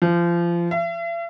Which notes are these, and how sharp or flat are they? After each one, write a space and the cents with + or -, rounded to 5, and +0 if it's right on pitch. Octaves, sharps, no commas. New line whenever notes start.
F3 -25
E5 +45